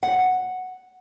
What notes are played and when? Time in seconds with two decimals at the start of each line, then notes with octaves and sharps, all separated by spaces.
0.03 F#5